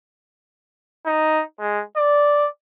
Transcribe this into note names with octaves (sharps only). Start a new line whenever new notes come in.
D#4
G#3
D5